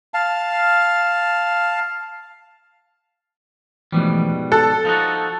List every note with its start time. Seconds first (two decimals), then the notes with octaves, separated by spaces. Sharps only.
0.14 F5 A5
3.92 G#2 B2 E3 F3 G3 A3
4.52 A4 F#6
4.85 F3 D#4 F#4